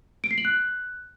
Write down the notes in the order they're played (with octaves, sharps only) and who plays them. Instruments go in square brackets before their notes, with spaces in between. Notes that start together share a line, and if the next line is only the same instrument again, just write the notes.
[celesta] D7
C7
F#7
F#6